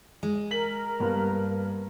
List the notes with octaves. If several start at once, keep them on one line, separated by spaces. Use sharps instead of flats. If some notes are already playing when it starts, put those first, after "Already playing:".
G#3
A#4 B6 F#7
G2 A#3 B3